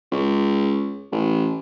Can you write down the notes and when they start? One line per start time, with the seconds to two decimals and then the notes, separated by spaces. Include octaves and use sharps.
0.12 C#2
1.12 A1